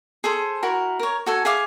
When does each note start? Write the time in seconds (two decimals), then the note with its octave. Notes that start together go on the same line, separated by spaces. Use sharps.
0.24 G#4 A4 C5
0.62 E4 F#4 A#4
0.99 A#4 C#5
1.26 F#4 A4 G#5
1.45 G#4 E5 F5 D6